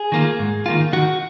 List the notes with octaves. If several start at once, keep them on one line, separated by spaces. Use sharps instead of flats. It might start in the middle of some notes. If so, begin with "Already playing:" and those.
Already playing: G#4
D#3 A#3 F4
G#2
D#3 A#3 F4
D#3 F#4